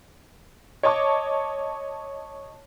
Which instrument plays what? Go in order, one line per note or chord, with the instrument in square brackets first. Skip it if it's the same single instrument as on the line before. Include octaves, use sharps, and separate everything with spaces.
[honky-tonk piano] C#5 D#5 A5 C#6 D6